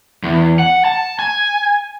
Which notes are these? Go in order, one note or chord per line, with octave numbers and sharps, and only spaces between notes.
E2
F#5
A5
G#5